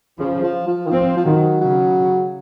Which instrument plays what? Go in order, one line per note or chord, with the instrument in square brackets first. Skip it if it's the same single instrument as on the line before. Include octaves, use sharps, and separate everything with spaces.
[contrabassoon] C#3 [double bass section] F3
[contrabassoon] F3
F3
D#3
[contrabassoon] F3 [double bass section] C4
[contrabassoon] F3
[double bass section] D#3 [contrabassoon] F#3
[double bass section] C#3 [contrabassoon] F#3